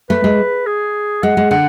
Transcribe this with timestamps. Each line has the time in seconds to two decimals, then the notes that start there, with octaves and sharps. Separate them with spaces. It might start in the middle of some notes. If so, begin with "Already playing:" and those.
0.10 A3 B4
0.24 G#3
0.66 G#4
1.23 G#3 F#5
1.37 G#3
1.51 D3 F#5